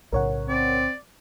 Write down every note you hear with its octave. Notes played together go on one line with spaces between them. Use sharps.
B1 A2 C#3 A#4 C#5 F#5
C4 D5